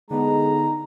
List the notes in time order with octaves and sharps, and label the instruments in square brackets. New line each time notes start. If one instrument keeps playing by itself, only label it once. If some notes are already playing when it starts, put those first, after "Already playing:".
[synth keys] D3 B3 [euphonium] G#3 [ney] D#4 [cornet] A#5